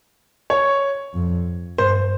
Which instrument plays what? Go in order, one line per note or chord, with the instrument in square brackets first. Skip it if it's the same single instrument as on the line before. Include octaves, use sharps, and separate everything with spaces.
[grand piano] C#5
[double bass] F2
[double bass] G2 [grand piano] C5